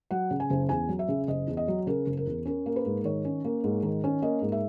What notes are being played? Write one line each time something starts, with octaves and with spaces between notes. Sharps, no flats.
F#3 F#5
C#3
G#5
F#1
E2 G#5
F#3
E5
C#3
F#1 D#5
E2
D#5
F#3
C#3 A#4
F#1
A#4
E2
C#4 A#4
A#3
B4
G#2
D#3 C#5
C#4
A#3
G#2
D#3
C#4
A#3 D#5
G#2
E5